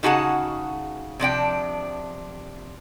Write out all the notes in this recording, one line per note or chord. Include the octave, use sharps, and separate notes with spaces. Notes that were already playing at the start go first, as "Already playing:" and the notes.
C#3 D#4 F#4 G#4 F#5 A5
C3 F3 D4 G5